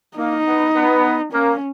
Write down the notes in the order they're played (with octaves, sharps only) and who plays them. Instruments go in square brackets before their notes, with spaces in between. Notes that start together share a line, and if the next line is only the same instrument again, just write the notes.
[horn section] A#3 [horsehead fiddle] D#4
[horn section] B3
B3
[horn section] A#3 [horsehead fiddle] C#4